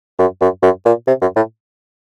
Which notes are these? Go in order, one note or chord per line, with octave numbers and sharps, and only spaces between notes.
F#2
F#2
F#2
A#2
C3
F#2
A2